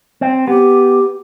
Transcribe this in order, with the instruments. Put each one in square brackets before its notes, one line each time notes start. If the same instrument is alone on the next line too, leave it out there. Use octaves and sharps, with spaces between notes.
[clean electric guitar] C4
[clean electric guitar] B3 [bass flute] G4